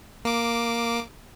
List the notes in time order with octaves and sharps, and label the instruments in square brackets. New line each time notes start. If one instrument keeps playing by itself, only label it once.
[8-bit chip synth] A#3 D6